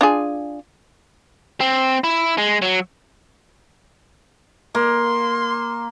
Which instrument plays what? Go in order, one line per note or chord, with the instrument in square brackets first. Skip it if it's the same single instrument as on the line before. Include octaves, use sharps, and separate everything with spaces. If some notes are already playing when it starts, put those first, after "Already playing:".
[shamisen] D4 F4 G#4
[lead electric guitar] C4
E4
G#3
F#3
[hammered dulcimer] A#3 [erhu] C6